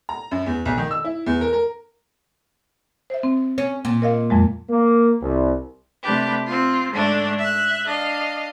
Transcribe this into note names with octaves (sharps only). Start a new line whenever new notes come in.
A#5
F#2
E2
B1
D#3
E6
E4
E2
A#4
A#4
C5 E5
C4
C#4
A#2
A#4 D#5 F5
F2 F#3 G#3
A#3
C2
C3 A3 D4 G4 B4
C4 F4
G#2 D3 A3 D4
E5 F#6
D4 D#5 F5